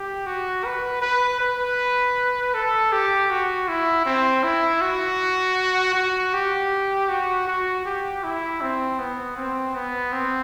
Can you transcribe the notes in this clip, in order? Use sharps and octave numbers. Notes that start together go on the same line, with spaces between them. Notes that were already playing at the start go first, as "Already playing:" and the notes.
Already playing: G4
F#4
B4
B4
B4
A4
G4
F#4
E4
C4
E4
F#4
F#4
G4
F#4
F#4
G4
E4
C4
B3
C4
B3
C4